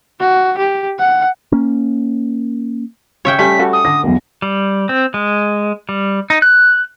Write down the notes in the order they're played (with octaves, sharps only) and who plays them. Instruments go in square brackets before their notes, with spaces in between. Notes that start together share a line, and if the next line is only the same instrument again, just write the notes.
[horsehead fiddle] F#4
G4
F#5
[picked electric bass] A#3 C#4
[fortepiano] C#3 F5 [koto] C#5 E5 G5
[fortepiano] G3 [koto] A3 C#4 [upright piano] G4 [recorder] B6
[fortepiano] G3 F#4 A4
[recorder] D#6
[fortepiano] D3 [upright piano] A#6
[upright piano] B1 E2
[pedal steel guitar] G3
C4
G#3
G3
D#4
F#6